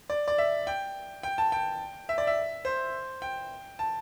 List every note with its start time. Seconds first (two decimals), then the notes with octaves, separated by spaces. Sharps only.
0.10 D5
0.28 D5
0.38 E5
0.67 G5
1.23 G5
1.38 A5
1.52 G5
2.09 E5
2.18 D5
2.27 E5
2.65 C5
3.22 G5
3.79 A5